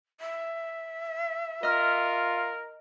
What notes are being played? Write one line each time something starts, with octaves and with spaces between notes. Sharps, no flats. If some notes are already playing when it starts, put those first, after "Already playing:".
E5
F4 A#4 D#5 F6